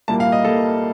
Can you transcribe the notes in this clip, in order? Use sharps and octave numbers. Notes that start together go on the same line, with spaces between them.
C2 A#2 G3 A#3 A5
F5
D#5
C2 A#2 G3 A#3 A4